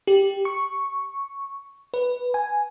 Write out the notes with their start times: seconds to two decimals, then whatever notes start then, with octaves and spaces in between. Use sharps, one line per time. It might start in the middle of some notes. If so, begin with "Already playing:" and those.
0.07 G4
0.45 C#6
1.94 B4
2.34 G#5